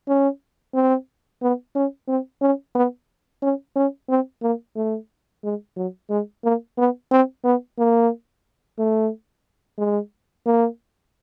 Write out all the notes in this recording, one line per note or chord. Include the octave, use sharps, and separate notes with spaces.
C#4
C4
B3
C#4
C4
C#4
B3
C#4
C#4
C4
A#3
A3
G#3
F#3
G#3
A#3
B3
C4
B3
A#3
A3
G#3
A#3